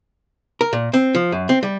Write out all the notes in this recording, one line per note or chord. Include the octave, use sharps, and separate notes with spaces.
A#4
A#2
C4
F3
F#2
C4
G3